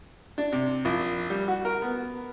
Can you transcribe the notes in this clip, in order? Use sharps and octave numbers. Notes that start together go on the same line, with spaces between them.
D4
C3
A#1
G3
F#4
A#4
B3